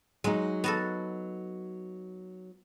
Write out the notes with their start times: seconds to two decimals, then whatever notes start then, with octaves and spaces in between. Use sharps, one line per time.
0.24 F#3 G#3 D#4
0.64 B3 F#4 A4